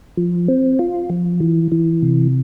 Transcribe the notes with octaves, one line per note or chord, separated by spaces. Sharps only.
F3
C4
F4
F3
E3
E3
C3